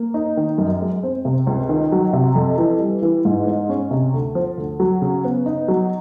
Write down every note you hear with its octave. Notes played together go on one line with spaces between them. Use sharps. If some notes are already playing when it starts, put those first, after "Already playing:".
Already playing: A#3
D#4
D#3
F#2
G#3
C4
C3
C#2
D#3
F#3
C3
F2
E3
G3
E3
G#2
G#3
C#4
C3
D2
F3
D2
F#3
C#3
B3
D#4
F#3